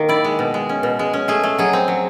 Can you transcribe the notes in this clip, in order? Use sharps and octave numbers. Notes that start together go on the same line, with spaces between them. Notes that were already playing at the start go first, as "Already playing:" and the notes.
Already playing: D#3 A#3
E4 D5
G#3
B2
G#3
C#4
B2
G#3
C#4
A3 G#4
A3
F#3 G#4
C4
F#3